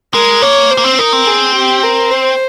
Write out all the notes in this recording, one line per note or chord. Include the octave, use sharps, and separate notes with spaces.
G#3 A#4
A#3 C#5
C5
A#3
C4
D#4 A#4
C4
G#4
G4
A#4
C5